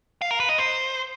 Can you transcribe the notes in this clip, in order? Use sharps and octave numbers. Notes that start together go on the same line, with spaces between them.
F5
A#4
B4
D#5
C5